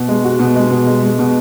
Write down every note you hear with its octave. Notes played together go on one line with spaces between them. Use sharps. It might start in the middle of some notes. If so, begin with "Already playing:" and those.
Already playing: B2
G#3
F#4
B2
G#3
B2
G#3
G#3
B2